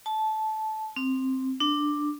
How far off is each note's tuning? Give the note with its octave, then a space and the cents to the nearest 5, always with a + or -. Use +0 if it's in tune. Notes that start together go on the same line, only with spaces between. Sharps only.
A5 -15
C4 +5
D4 +5